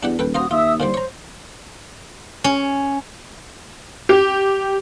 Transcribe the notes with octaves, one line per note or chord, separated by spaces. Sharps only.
E2 D4 G4 F#5
D#1 A4 B4 G5
F4 F#4 C5 A#5 D#6
D#2 F4 E5 D#6 E6
A#2 D3 G3 C5
C#5 A#5
C#4
G4